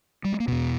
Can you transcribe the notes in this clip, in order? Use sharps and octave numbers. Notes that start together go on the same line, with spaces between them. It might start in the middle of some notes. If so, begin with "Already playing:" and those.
G3
G#3
A#3
E2 B2 B3